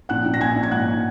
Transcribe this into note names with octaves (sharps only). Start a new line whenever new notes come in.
A#1 F#5 F#6
A#1
A#6
A#1 G#5 G#6
A#1
G#6
G#2 F#5 F#6